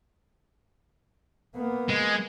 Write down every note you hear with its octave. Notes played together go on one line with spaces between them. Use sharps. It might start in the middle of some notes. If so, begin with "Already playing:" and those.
A#3 B3
G#3